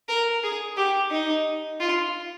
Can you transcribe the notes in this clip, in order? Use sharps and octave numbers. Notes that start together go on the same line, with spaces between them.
A#4
G#4
G4
D#4
F4